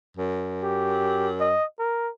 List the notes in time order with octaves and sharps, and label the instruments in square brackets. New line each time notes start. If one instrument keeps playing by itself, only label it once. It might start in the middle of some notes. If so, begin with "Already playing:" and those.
[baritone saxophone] F#2
[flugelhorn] G4
D#5
A#4